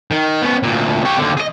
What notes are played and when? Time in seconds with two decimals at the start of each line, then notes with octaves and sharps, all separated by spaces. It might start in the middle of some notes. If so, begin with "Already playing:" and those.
0.11 D#3
0.42 B3 C#4
0.63 D2 A#2
1.05 G4 C#5
1.18 D#2 D3
1.37 G#4 D#5